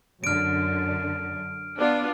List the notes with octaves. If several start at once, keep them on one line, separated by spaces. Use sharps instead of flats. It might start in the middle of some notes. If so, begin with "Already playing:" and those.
F#2 D3 F6 D7
B3 D4 F4